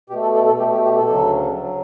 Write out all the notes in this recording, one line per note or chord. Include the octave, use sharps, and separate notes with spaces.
B2 A3 G4
A4
A4
A4
B2 A3 G4
G4
G4
A4
D2 C#3 F#3
C#3 F#3